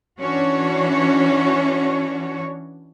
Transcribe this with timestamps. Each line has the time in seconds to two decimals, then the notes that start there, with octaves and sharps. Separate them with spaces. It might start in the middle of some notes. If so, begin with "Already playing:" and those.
0.20 E3 C#4 D4 F#4 C#5